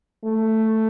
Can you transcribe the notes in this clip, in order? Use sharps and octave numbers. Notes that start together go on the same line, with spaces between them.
A3